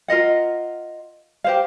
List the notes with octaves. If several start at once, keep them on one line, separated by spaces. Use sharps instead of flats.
F4 A#4 D#5 F#5
G4 C5 F5